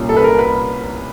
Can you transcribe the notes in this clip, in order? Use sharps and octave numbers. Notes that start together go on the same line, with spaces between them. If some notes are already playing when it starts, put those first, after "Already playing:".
Already playing: C2 A#2 G3 A#3 C#4
A4
B4
A#4
B4